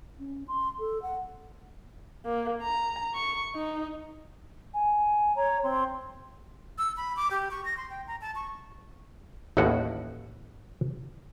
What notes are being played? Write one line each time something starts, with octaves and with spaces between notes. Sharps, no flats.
C#4
C6
A4
F#5
A#3
A#5
C#6
D#4
G#5
C#5 A#5
C4 C6
E6
B5
D6
G4
C#6
A#6
C6
G5
A#5
A5
C#6
A1 D#2 A2 F#4 F#5